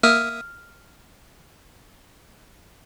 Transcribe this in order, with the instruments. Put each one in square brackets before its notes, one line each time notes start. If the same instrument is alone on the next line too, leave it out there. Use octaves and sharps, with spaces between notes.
[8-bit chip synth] A#3 E5 D#6 [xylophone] F6